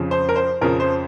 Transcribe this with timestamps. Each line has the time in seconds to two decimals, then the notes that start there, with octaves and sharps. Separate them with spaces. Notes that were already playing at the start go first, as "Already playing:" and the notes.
Already playing: F2 C#3 F3
0.11 C5
0.29 A#4
0.36 C5
0.61 F2 C#3 F3 A#4
0.80 C5